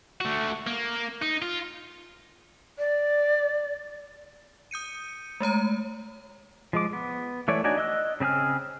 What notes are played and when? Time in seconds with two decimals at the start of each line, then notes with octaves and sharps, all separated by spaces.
0.21 A3 F#4
0.67 A#3
1.22 D#4
1.42 F4
2.79 D5
4.71 D#6 G6 C#7 D#7
5.40 G#3 A3 C#5 A#5
6.73 F3 G#3 D6
6.93 B3
7.48 E3 A3 C#5 D5
7.64 D4 D#4 F#4 D5 G#5
7.78 D#5 E6 F#6
8.20 C#3 C4 G#4 G#5 F6